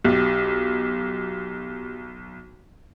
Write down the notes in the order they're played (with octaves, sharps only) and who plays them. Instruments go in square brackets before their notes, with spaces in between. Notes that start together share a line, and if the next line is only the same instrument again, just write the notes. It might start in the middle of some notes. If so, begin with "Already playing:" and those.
[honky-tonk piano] B1 [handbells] G4